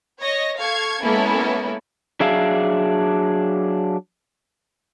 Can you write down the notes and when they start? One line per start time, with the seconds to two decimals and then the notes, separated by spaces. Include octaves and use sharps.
0.21 C#5 D#5 A#6
0.59 A4 F5 C#6 G#6
1.04 G#3 A#3 B3 C#4 E4 A4
2.20 F#3 D4 G#4 E5 F5